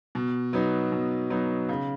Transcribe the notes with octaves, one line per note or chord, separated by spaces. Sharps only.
B2
F#3 B3 D#4
B2
F#3 B3 D#4
C#3